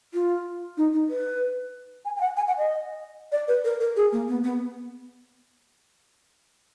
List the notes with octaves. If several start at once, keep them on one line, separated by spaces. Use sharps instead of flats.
F4
D#4
D#4
B4
G#5
G#5
F#5
G#5
F#5
D#5
D5
B4
A#4
A#4
G#4
A#3
B3
B3